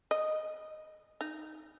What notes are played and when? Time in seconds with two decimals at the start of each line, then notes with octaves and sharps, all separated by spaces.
0.11 D#5
1.21 D#4